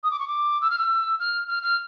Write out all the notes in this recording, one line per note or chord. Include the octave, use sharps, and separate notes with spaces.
D#6
D6
C#6
D6
E6
F6
E6
F6
F6
F6